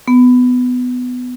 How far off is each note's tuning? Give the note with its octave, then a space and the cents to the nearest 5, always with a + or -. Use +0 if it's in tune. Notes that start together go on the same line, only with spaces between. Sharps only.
B3 +15